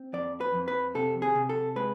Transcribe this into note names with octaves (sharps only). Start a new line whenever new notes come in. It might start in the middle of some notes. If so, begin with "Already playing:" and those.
Already playing: C4
F2 D5
B4
F2
B4
C3 A4
G#4
C3
A4
G#3 B4